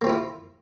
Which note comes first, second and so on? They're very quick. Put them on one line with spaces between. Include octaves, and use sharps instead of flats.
A#3 C4 F4 E4